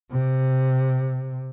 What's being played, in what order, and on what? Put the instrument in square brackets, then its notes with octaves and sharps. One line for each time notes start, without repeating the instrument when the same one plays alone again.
[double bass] C3